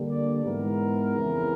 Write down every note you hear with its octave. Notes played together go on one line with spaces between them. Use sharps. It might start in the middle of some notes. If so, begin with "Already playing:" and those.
Already playing: D3 G3 A#3 D4
D5
G#2 E3 G#3 B3 A#4
F2 C#3 E3